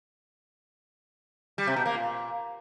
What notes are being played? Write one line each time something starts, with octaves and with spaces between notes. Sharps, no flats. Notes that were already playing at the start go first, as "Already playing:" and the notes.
G3
C3
B2
A#3
A#2